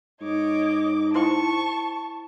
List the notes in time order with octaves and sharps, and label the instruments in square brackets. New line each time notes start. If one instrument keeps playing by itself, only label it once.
[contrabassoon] G#2 [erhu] C#5 [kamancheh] D#5 D6
[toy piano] E4 C5 G5 [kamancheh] A5 [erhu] C#6